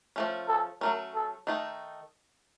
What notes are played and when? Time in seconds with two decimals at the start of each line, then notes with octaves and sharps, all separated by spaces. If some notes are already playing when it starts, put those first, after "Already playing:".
0.16 F3 A3 C#4
0.48 A4
0.81 F#3 A3 C#4 A#4
1.15 A4
1.47 D#3 A3 D#4